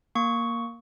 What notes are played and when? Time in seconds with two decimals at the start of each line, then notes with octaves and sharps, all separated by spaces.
0.15 A#3 C#6